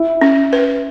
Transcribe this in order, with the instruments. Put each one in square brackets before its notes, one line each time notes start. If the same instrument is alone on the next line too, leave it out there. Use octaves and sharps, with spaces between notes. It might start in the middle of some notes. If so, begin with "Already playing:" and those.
Already playing: [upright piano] E4
[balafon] C#4
B4